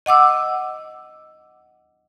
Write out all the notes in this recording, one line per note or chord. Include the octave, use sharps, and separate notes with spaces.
D#5 F#5 D6 E6